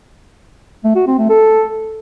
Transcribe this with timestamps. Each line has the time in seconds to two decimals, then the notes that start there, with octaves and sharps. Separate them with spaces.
0.84 A3
0.96 F#4
1.07 C4
1.18 A3
1.30 A4